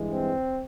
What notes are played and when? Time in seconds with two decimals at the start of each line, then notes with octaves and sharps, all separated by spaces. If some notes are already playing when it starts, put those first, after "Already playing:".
Already playing: G2 E3 G#3
0.09 C4